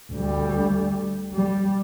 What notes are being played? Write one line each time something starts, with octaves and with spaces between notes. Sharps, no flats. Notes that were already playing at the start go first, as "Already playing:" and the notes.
D2 G3
G3